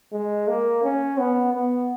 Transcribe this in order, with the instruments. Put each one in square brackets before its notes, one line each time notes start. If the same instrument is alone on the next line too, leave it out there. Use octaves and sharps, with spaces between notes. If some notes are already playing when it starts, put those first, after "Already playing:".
[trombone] G#3
A#3
C#4
B3
B3